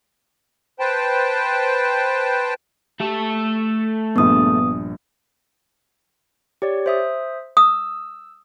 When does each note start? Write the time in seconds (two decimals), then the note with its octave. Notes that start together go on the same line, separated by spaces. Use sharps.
0.79 B4 C5 G5 A5
3.00 A3 G4 A4
4.16 A#1 G2 B3 D#6
6.62 G4 C#5 D5
6.86 C5 E5 D#6
7.57 D#6 E6